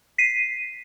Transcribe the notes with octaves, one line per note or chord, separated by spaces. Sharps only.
B6 C7 D#7